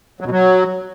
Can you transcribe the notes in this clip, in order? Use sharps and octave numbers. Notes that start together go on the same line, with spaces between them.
F#3
B2
F#3